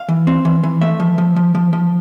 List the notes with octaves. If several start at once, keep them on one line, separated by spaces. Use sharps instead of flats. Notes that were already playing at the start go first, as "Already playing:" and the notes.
Already playing: F5
E3
C4
E3
E3
A3 E5
F3
F3
F3
F3
F3